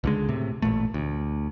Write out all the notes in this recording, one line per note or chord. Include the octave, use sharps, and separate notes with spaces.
C#2 D3 G#3
A2 C3
A1 A#2 A3
D2